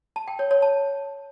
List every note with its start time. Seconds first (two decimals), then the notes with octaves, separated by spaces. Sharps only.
0.16 A5
0.28 G5
0.39 C#5
0.51 C#5
0.62 A5